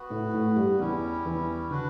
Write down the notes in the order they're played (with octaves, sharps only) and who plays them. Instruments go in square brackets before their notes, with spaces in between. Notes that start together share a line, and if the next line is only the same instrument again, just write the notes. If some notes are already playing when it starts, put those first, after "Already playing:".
Already playing: [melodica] B3 F#4 B4
[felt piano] A2 A3
A2 A3
G2 G3
[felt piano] E2 E3 [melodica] G3 C#4 E4
[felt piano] E2 E3
[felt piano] D3 [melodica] D4 F#4 B4